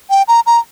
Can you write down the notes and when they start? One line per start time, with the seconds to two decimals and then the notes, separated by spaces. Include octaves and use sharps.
0.10 G5
0.28 A#5
0.46 A#5